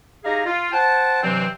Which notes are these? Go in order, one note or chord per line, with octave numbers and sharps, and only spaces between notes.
D#4 G4 G#4 F5 A#5
F4
C5 F#5 G5 A5
G2 C3 E3 F#3 C4